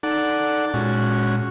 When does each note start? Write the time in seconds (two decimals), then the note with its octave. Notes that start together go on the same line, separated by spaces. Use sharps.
0.03 D#4 A4 D5 F#5
0.74 A#2 G#3 C#4 F#4